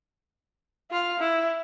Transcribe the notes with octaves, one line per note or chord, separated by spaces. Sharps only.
F4 F5
E4